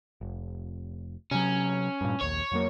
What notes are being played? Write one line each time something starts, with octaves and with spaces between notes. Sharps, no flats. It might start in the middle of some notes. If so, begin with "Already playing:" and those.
F1
C3 F#3 C#4
G2 A#2
A#1 D#2 C#5
F2 F#3 A#3